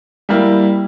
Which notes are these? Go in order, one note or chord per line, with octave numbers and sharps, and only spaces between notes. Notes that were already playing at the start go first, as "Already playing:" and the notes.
G3 A#3 E4